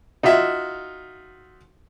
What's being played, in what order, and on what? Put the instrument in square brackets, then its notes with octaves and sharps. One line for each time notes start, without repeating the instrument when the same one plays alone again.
[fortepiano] D#4 F4 F#4 E5